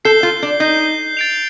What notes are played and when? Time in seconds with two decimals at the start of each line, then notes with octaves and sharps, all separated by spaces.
0.05 A4 G6 C7 G7
0.23 F4
0.43 D4
0.60 D#4 G6 C7 G7
1.17 A6 D7 F7